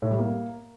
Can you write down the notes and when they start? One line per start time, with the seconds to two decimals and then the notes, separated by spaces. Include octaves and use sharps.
0.02 A2
0.11 G3
0.19 A#3